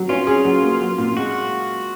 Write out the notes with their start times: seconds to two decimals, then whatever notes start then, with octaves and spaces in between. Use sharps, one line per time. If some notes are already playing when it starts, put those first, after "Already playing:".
Already playing: F#3
0.09 C#4 F4
0.27 G#4
0.45 F#3
0.63 A#3
0.81 F#3
0.98 A#2
1.16 G#3 F#4